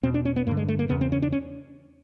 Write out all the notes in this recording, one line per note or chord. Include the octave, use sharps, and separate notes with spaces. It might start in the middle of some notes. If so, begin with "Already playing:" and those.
E2 B2 C4
D4
C#4
B3
G2 D3 A#3
G#3
A3
A#3
E2 C#3 B3
C4
C#4
D4
C#4